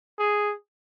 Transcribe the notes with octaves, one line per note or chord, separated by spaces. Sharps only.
G#4